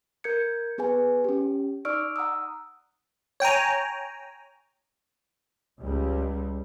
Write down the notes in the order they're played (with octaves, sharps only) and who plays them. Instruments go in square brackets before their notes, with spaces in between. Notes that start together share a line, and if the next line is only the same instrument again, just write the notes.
[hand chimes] A#4 G6 G#6 C#7
B3 G#4 B4 G#5
C#4 G4
D#4 D5 C#6 E6 F6 D7
F#5 A#5 D#6 E6
[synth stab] C#5 G5 G#5 A#5
[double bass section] C#2 G3